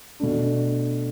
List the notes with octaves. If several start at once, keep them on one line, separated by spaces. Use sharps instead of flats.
B2 A3 D4